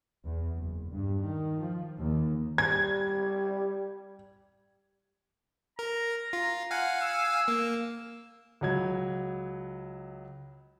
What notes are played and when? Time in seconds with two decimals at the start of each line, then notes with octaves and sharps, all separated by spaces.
0.25 E2
0.57 F#1
0.91 G2
1.24 D#3
1.60 F3
1.99 D#2
2.58 G3 G#6
5.79 A#4 A#5
6.33 F4
6.71 F5 F#5 G#5
7.02 E6
7.48 A#3
8.61 C#2 F#3 G#6